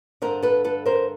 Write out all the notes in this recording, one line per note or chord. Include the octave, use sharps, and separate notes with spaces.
G2 D3 A#4 C5
A4 B4
A4 B4
A#4 C5